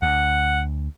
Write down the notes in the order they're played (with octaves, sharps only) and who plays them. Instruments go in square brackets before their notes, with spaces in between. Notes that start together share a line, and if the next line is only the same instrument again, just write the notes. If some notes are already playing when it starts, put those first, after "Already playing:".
[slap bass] D2 [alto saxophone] F#5